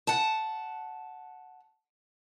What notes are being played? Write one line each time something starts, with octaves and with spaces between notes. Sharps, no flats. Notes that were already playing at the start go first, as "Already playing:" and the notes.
F#5 A5